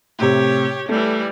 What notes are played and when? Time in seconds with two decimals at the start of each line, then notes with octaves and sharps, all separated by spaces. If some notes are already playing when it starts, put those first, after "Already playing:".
0.19 A2 C3 G4 C#5
0.89 E3 G3 A3